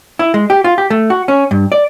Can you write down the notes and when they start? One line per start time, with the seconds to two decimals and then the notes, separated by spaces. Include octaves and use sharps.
0.19 E4
0.34 G#3
0.50 G4
0.64 F4
0.78 G4
0.90 A3
1.10 F#4
1.28 C#4
1.51 G2
1.72 D5